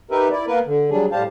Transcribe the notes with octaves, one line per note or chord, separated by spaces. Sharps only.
D#4 G4 A#4 B4 E5
E4 D5
A#3 B3 A#4 B4
D3
F#3 G3 D4 G#4
A2 G3 G4 C5 F5 A5